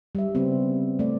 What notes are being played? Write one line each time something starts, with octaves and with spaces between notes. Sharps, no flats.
G3 E5
C#3 B3 C4
A3 D5